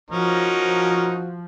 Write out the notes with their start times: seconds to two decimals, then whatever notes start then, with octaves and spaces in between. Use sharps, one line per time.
0.11 F3 C#4 D#4 F#4 A#4